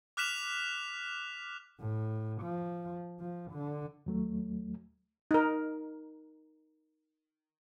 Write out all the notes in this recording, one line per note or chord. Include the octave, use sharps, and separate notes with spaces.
D6 F6 F#6 B6 E7 F7
A2
F3
F3
D3
D#2 F#3 A3
D#4 A#4